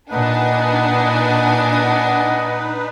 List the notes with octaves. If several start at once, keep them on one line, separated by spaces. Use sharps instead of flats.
A#2 D4 D#4 B4 D#5 F#5 G#5